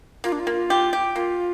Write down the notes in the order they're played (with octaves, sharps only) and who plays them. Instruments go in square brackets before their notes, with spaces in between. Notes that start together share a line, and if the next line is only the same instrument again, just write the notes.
[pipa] A#3 [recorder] F4
[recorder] D4
F4
[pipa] A#3
G4
G4
[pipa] A#3 [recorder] F4